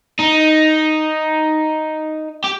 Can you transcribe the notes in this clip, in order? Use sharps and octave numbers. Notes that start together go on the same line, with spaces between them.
D#4
G4